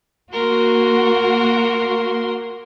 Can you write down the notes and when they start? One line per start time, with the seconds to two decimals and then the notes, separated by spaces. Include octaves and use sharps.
0.33 A#3 F#4 A#4 C6